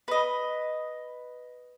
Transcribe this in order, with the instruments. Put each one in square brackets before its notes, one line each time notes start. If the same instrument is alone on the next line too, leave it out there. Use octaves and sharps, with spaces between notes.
[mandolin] B4 D#5